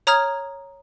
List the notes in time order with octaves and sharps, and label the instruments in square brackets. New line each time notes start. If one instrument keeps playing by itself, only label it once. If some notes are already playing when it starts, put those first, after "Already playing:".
[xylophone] C#5 A#5 D#6 F6 G#6